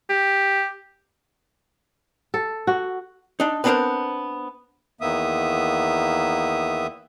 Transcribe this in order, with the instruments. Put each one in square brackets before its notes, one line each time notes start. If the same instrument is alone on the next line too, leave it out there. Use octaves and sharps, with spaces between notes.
[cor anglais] G4
[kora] A4
F#4
[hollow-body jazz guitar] D4 D#4
B3 C4 D4 F4 A#4 C5
[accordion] E2 D#3 A#3 B3 E5 D#6